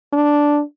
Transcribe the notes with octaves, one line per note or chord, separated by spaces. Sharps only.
D4